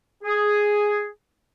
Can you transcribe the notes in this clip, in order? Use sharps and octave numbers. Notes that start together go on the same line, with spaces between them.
G#4